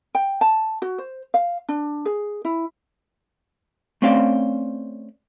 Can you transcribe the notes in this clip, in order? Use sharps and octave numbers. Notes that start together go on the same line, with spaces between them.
G5
A5
F#4
C5
F5
D4
G#4
E4
A3 C4 C#4 C5 D5 F5